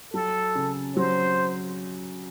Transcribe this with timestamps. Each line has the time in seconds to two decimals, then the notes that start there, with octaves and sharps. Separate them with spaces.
0.14 F#3 A4
0.55 C#3
0.96 F#3 C5